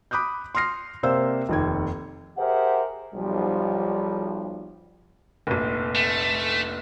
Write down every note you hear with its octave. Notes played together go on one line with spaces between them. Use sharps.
B5 D6 D#6 F#6 G6
C6 D#6 F6 A#6 C7
C3 A#3 C5 D5 F5 E6
F1 D#2 G#6
G4 G#4 A#4 C5 E5 F#5
B1 F3 G3
F1 A#1
A3